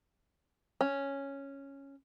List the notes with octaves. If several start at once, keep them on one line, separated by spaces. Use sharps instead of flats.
C#4